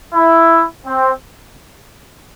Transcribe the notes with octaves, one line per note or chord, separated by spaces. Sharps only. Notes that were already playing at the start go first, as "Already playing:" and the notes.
E4
C4